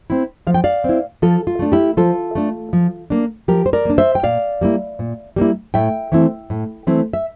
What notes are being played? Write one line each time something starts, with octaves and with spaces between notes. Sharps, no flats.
C4 E4
F3 F5
G5
D5 F5
C4 E4
F3 F4 A4
F4
A3 D4
E4 G4
F3 F4 A4
A3 D4
F3
A#3 D4
F3 G4 A#4
C5
A#4 D5
A#3 D4
C5 E5
G5
A#2 D5 F5
G3 A#3 E4
A#2
G3 A#3 E4
A2 E5 G5
E3 A3 C4 E4
A2
E3 A3 C4 E4
E5